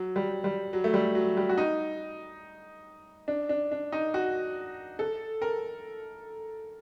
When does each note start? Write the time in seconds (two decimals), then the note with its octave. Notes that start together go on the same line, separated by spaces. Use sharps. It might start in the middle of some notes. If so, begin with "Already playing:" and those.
Already playing: F#3
0.16 G3
0.44 G3
0.73 F#3
0.84 A3
0.94 G3
1.15 F#3
1.37 G3
1.49 F#4
1.58 D#4
3.28 D4
3.49 D4
3.72 D4
3.92 D#4
4.14 F#4
4.99 A4
5.42 A#4